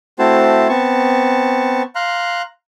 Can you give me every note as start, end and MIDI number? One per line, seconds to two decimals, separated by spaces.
0.19 0.67 57
0.19 0.67 60
0.19 0.67 64
0.19 0.67 66
0.19 0.67 72
0.19 0.67 81
0.69 1.82 59
0.69 1.82 60
0.69 1.82 81
0.69 1.82 85
1.95 2.42 77
1.95 2.42 82
1.95 2.42 84
1.95 2.42 90